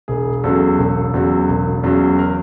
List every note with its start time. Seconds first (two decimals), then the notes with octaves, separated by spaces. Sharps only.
0.08 E1 G#4
0.44 E2 C#3 F#3 A4
0.78 E1
1.14 E2 C#3 F#3
1.48 E1
1.83 E2 C#3 F#3
2.18 A#4